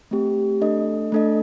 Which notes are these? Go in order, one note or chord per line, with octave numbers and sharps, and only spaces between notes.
A3 C4 G4
A3 D4 A4 D#5
A3 D4 A4 D#5